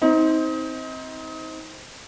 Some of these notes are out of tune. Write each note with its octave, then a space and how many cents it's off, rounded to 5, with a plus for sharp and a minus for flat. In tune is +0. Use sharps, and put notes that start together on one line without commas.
C4 +0 D#4 +30